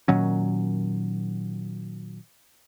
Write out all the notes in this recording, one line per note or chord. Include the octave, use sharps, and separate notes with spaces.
A#2 D#3 F#3 C#4